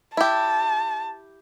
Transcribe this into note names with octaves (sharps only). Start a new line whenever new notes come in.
E4 G4 A5